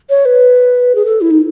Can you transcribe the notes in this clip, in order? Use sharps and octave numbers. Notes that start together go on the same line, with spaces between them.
C#5
B4
G#4
A4
E4
D#4